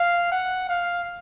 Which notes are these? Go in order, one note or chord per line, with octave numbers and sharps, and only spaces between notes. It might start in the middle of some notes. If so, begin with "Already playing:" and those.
Already playing: F5
F#5
F5